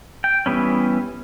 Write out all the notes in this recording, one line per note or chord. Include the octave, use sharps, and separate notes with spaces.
G5
E3 G3 B3 C#4